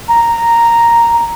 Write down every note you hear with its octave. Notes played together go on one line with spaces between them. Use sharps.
A#5